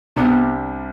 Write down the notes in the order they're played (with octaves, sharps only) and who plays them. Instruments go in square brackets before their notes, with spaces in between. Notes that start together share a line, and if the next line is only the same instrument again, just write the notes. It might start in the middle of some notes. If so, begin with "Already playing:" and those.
[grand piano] C2 C3 G3 D4 [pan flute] B3